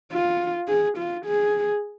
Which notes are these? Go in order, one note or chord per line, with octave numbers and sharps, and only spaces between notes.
F4
G#4
F4
G#4